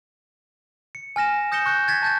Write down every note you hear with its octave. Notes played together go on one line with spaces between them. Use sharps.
C#7
G#5 F6 A#6 E7
D#6 G6 A#6 C#7 E7 G7
C#6 F#6 G6 C#7
G#6 A6 B6
A5 G6 A6